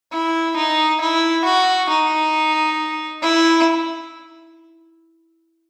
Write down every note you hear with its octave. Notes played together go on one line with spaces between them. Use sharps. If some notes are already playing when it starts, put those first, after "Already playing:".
E4
D#4
E4
F#4
D#4
E4